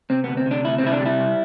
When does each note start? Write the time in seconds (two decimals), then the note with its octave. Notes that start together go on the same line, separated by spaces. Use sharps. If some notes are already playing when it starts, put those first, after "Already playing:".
0.10 C3 C4
0.24 D2 B3
0.37 C4
0.46 C3 D4
0.64 D2 E4
0.78 C4
0.83 C3 E4
0.92 D4
1.01 G3 E4
1.19 C2